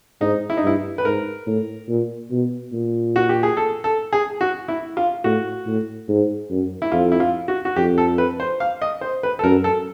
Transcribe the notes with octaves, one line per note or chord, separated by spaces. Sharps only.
G#2 D#4
E4
D#4
G2 E4
B4
G#2 A#4
A2
A#2
B2
A#2
F#4
G4
G#4
A4
A4
G#4
F#4
E4
F4
A2 F#4
A2
G#2
F#2
E4
F2 F4
E4
F4
F#4
F#4
F2 G4
A4
B4
C5
F5
D#5
C5
B4
A4
F#2 A#4
A4